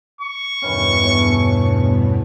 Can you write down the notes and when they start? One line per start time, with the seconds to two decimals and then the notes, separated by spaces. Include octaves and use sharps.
0.21 C#6
0.62 E2 G2 B2 D#3 E3 C#4
1.02 A2 G#5